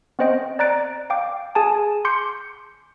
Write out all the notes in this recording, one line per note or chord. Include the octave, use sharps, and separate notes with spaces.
B3 C4 C5 D#5 G5
D5 A#5 F#6 A6 D7
F5 G5 D6
G#4 G#5 A5
C6 D6 G6 C#7